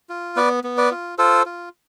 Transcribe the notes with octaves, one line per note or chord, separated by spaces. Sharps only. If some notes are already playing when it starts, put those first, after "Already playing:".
F4
B3 B4 D5
B3
B4 D5
F4
F4 A4 C5
F4